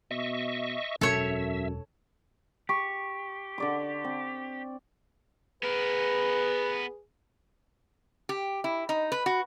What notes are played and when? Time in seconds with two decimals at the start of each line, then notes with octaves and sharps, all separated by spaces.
0.11 B2 D#5 E5 C#6
1.01 E1 F#2 A4 C#5 E5
2.69 G4 C#6
3.58 D3 D5 C6
4.04 C4
5.63 B3 G#4 A#4 B4
8.29 G4
8.64 E4
8.89 D#4
9.12 B4
9.26 F#4